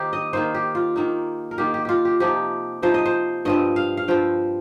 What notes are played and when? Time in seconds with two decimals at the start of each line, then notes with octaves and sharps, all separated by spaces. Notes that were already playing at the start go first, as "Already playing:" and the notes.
Already playing: D#3 A#3 D#4 G4 C5
0.13 D#5
0.33 D#3 A#3 D#4 C5
0.54 G4
0.75 F4
0.96 D#3 A#3 D#4
1.51 A#4
1.58 D#3 A#3 D#4 G4
1.74 G4
1.85 F4 G4
2.05 G4
2.20 C3 F3 D#4 G4
2.82 C3 F3 D#4 C5
2.94 D#5
3.05 C5
3.45 G2 F3 C4 D#5
3.76 F5
3.97 F5
4.08 G2 F3 C4 G5